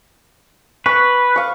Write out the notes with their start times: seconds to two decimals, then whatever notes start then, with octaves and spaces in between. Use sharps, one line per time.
0.86 B4 C#6
1.36 F5 C#6